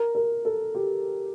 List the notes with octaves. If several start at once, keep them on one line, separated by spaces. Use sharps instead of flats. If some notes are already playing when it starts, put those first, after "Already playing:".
Already playing: A#4
A#4
A4
G4